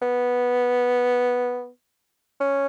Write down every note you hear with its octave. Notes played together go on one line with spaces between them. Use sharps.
B3
C#4